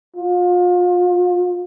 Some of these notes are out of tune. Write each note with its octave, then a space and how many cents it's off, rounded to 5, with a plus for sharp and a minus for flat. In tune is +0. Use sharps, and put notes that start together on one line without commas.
F4 +35